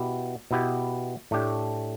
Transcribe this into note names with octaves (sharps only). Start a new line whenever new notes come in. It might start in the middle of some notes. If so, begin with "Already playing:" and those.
Already playing: B2 B3 E4 G4
B2 B3 E4 G4
A2 A3 D4 G4